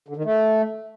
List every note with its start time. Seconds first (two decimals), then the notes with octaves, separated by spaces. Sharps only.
0.08 D3
0.17 D#3
0.25 A3